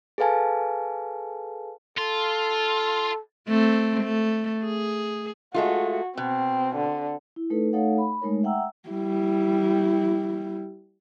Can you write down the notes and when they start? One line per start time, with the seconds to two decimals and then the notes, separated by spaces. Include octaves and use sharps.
0.18 G#4 A4 B4 F5 G#5 A5
1.98 F4 A4
3.49 A3 C4
4.03 A3
4.64 G#4
5.54 G#3 A3 F4 F#4
6.17 B2 C4
6.76 D3
7.36 E4
7.50 A3 D#4 A4 B4
7.73 A3 D#4 A4 C#5 F5 F#5
7.98 B5
8.21 G#3 A3 D#4 A#4 C#5
8.43 E5 F#5 G5 A#5 E6
8.89 G3 E4